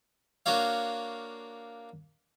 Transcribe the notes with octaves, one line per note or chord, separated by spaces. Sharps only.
A#3 D4 F#4 C#5 F5